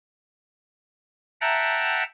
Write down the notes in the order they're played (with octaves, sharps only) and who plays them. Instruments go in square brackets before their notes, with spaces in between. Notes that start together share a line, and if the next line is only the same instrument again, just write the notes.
[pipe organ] E5 F#5 G5 A5 A#5